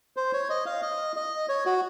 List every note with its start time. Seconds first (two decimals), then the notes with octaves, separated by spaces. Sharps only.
0.17 C5
0.33 C#5
0.50 D#5
0.66 F5
0.82 D#5
1.16 D#5
1.49 C#5
1.66 F#4